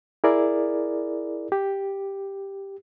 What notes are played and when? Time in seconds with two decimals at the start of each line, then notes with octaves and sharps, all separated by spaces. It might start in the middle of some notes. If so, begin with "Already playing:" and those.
0.24 E4 G#4 A#4 D5
1.52 G4